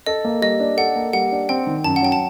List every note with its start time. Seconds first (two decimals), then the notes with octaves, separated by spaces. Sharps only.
0.06 A4 D#5
0.25 A#3
0.42 G3 D#5
0.60 D4
0.77 A4 F#5
0.96 A#3
1.13 G3 F#5
1.32 D4
1.49 C4 G5
1.67 D#3
1.84 F#2 A5
1.96 F#5
2.02 F#3 G5
2.12 A5